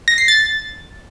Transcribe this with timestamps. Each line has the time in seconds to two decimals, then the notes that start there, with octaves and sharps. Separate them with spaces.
0.08 A#6
0.18 C7
0.28 A6